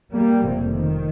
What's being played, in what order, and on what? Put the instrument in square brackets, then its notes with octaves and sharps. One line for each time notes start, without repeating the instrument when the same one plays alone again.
[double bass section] G3 A#3
F1 F2 C3
D#3